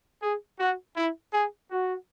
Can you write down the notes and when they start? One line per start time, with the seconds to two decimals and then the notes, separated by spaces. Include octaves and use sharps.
0.22 G#4
0.60 F#4
0.96 E4
1.33 G#4
1.71 F#4